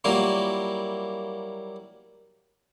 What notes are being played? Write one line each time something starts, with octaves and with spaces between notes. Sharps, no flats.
F#3 G3 A#3 E4 F4